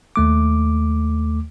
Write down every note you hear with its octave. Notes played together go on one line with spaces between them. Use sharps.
D#2 A3 D6